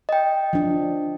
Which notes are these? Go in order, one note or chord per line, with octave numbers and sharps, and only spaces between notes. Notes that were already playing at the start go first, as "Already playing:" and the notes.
D#5 G5
F3 D4